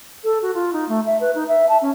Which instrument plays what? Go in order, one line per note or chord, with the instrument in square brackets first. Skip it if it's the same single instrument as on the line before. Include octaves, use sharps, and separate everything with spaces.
[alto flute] A4
F#4
F4
D#4
A3
E5
B4
D#4
E5
A5
C#4